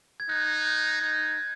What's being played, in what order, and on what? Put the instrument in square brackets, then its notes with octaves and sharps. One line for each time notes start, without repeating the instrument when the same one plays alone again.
[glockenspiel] G#6
[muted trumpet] D#4 [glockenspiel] F#6
[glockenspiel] G#6
[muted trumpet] D#4 [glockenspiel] G#6